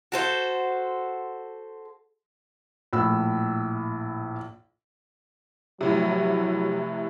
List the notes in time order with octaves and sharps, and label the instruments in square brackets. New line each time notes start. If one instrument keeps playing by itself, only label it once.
[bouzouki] F#4 A4 C5
[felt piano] A#1 A2 B5 E6
[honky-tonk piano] F1 A2 C3 [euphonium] F#3